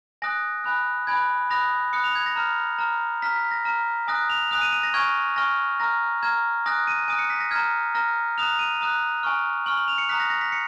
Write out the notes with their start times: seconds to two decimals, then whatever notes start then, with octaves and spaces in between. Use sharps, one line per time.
0.22 G#5 D#6 F#6 A#6
0.64 G#5 B5 F#6
1.07 G#5 B5 F#6 G#6
1.50 B5 D#6 F#6 A#6
1.93 B5 D#6 F#6 C#7
2.04 F7
2.15 G#6
2.26 A#6
2.36 A#5 F6
2.79 A#5 F6
3.22 A#5 F6 B6
3.36 B6
3.51 A#6
3.65 A#5 F6
4.08 G#5 D#6 F#6 A#6
4.30 F7
4.51 G#5 D#6 F#6 F7
4.61 D#7
4.72 D#7
4.83 A#6
4.94 G#5 C#6 F6 G#6
5.36 G#5 C#6 F6 A#6
5.80 A#5 F6 A#6
6.23 A#5 F6 G#6
6.66 G#5 D#6 F#6 A#6
6.87 D#7
7.08 G#5 D#6 F#6 D#7
7.19 C#7
7.30 B6
7.40 A#6
7.51 A#5 F6 G#6
7.95 A#5 F6 A#6
8.38 A#5 D#6 F#6 F7
8.59 D#7
8.81 A#5 D#6 F#6
9.23 G#5 C#6 F6
9.66 G#5 C#6 F6 F#7
9.77 F#7
9.88 F7
9.98 C#7
10.09 A#5 D#6 F#6 B6
10.20 A#6
10.30 A#6
10.41 B6
10.52 C#7